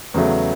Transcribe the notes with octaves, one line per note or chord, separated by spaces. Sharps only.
E2 C#3 F#3 A3